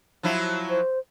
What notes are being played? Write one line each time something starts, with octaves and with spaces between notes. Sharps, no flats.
F3 F#3 E4
C5